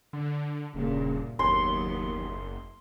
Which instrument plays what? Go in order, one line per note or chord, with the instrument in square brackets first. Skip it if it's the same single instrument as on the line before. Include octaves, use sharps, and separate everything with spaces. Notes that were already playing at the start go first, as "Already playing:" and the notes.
[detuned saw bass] D3
[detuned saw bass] D#1 [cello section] G2 A#2 A#3 [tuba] C#3
[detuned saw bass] F#1 [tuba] D#2 [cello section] F#3 B3 [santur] C6